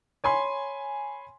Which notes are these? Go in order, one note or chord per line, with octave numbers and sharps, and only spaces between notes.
C#5 G#5 B5 C6